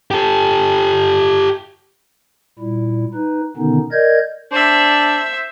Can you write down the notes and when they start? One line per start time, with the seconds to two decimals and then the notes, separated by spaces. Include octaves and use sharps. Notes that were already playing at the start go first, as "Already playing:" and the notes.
0.11 G4 A4
2.59 A#2 G3 E4
3.14 D#4 B4
3.57 B2 D3 D#3 B3 C#4 D#4
3.92 A#4 D5 D#5 G6 G#6
4.52 D4 C5 E5